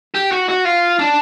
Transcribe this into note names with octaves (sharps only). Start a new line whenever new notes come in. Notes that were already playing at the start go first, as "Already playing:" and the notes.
G4
F#4
F#4
F4
D4